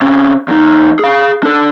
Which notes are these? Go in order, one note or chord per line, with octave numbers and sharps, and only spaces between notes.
C3 C#4
E2 D#4
G#4 F5
D4 A4